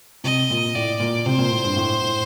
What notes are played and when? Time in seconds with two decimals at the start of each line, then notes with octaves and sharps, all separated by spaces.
0.24 C3 D#5
0.50 A#2
0.75 A2 D5
1.00 A#2
1.26 C3 C5
1.38 A#2
1.51 A2
1.64 G2
1.76 A2
2.02 A2